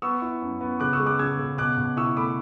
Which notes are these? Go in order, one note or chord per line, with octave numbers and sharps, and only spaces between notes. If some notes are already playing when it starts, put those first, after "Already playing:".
B3 C#6 E6
E4
F#2
B3
C#3 D6 F#6
C#6 E6
G#3
D6 F#6
C#3 E6 G#6
C#3
B2 D6 F#6
B2
E4 C#6 E6
A3 B5 D6